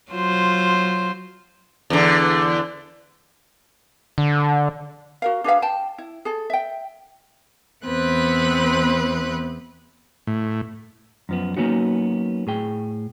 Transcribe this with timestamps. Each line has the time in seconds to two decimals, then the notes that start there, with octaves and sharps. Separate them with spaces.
0.12 F#3 F4 C5
1.90 E2 D3
4.18 D3
5.22 F#4 A#4 F5
5.44 D4 G#4 B4 F5
5.62 G5 A5
5.98 E4
6.25 G#4 A4
6.50 E5 G5
7.85 E2 B3 C4 B4 F#6
10.27 A2
11.29 F#2 F3 B3
11.57 F#3 A#3 B3 C#4 D#4 F#4
12.47 A2 G#4 G5